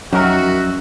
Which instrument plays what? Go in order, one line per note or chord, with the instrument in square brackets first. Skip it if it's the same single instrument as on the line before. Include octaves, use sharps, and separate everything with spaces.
[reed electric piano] F2 F#3 [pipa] D#3 A#4 [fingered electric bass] C#4 [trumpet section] F#4 E5